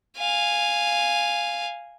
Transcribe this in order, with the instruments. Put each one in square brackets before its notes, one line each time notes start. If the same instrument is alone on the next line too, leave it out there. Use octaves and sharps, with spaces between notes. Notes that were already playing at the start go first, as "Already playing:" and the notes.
[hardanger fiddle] F5 G#5